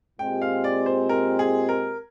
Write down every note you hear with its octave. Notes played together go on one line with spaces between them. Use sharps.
A#2 G#3 C4 G4 G5
F5
D5
C5
A#4
G#4
A#4